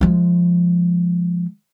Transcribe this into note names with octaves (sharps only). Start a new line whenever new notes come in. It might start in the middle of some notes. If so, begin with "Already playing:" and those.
F3 G#3